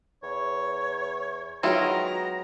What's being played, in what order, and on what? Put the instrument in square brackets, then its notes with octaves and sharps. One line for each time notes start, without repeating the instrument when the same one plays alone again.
[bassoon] E2 [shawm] C#5
[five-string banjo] D#3 E4 F4 [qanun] F#3 G#3 [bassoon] B3 [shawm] A#5